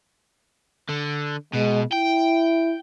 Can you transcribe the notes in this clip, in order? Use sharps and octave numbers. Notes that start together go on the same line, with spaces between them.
D3
B2 G#3
E4 G5